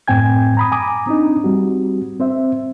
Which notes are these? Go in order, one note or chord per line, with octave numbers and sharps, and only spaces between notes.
F#2 A2 C4 G5 G#5 G#6
A#5 B5 D#6
G#5 A#5 D6 D#6
C4 D4 D#4
G3 C4 F#4
C4 C5 E5